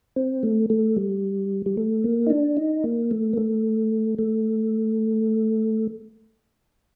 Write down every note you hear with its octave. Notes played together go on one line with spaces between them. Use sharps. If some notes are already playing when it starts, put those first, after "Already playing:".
C4
A3
A3
G3
G3
A3
A#3
D#4
D4
D#4
A#3
A3
A#3
A3
A3